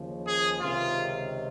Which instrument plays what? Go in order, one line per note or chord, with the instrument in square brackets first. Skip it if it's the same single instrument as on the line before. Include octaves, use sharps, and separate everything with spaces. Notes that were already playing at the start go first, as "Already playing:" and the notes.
Already playing: [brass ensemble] D#2 C#3 F3
G#4
C#2 C3 D#3 F4